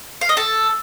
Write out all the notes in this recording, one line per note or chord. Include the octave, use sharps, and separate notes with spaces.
F5
D#5
A4